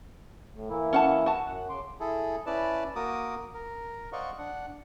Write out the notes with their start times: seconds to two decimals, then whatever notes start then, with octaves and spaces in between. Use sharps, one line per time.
0.54 A2
0.70 E3 A#3 E4
0.93 C#4 F#5 A5
1.26 F#4 A5
1.47 F#2 F#5
1.69 C#3 C6 D6
2.00 E4 G#4 A4
2.46 C#4 E4 B4 D5 A5
2.96 A#3 F#4 A#4 D6 D#6
3.54 A#4
4.13 C5 D5 D#5 F5 F#5 C#6
4.38 D4 F#5